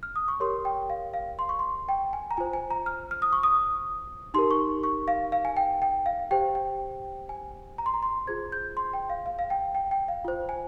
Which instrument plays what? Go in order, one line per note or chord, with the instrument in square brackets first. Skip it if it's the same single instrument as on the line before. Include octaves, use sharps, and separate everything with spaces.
[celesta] F6
D#6
C#6
G4 A#4 C#5 C6
G5
F5
F5
C6
C#6
C6
G5
G#5
A#5
F4 C5 G#5
G#5
A#5
F6
F6
D#6
C#6
D#6
D#4 G4 A#4 C6
C#6
C#6
F5
F5
G#5
G5
G5
F5
G4 C5 G5
G5
G#5
A#5
C6
A#5
C6
F4 G#4 C5 G#6
G6
C6
G5
F5
F5
F5
G5
G5
G5
F5
F4 C5
G#5